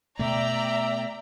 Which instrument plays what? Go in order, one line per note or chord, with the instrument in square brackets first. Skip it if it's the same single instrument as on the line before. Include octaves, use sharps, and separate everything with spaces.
[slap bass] B2 A3 [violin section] D5 G5 A#5 [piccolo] E5